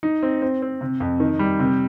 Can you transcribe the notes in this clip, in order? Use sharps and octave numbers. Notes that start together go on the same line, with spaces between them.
D#4
C4
C4
C4
C3
F2
D#3
G3
C3